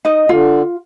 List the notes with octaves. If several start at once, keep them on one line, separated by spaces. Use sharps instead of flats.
D#4 D#5
D3 F4